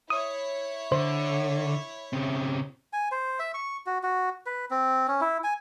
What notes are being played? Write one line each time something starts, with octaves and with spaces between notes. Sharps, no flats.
E4 C#5 D#6
D3 C5
C#3 C4
G#5
C5
E5
C#6
F#4
F#4
B4
C4
C#4
E4
G#5